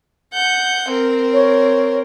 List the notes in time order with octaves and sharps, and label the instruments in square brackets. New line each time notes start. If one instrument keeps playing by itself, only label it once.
[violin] F#5 G6
C4 A#4
[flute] C#5